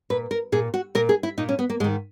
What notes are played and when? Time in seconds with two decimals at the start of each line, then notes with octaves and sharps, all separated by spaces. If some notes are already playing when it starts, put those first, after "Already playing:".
0.10 A#2 B4
0.31 A#4
0.52 A#2 G#4
0.74 F#4
0.95 A#2 A#4
1.09 G#4
1.23 E4
1.38 A#2 D#4
1.49 C#4
1.59 B3
1.70 A#3
1.80 G#2 G#3
1.84 D#3